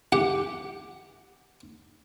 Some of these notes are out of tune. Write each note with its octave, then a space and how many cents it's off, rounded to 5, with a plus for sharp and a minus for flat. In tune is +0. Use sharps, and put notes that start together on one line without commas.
G4 +0 F#5 +5